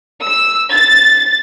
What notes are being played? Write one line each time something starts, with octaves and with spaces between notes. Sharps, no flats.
E6
A6